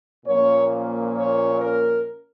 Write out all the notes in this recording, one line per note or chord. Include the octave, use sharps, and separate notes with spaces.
A#2 F3 A#3 C#4 C#5
C#5
A#4